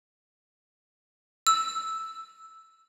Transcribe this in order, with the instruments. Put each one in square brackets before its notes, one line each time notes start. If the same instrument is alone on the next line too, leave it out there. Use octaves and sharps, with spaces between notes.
[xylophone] E6